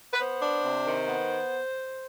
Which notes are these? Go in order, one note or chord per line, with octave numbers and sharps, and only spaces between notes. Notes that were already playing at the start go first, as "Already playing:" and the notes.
B4
B3 C5
D4
C3
D#3
B3